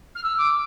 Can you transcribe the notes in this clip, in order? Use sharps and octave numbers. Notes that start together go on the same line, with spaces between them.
F6
E6
D6